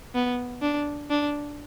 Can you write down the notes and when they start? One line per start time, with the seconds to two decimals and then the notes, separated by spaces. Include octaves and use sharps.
0.15 B3
0.62 D4
1.10 D4